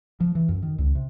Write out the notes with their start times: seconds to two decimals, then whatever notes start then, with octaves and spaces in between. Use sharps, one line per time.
0.20 F3
0.35 E3
0.49 F#2
0.62 D#3
0.78 C#2
0.95 C3